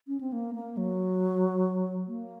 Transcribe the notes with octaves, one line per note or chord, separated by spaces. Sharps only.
C#4
C4
A#3
A#3
F#3
A#3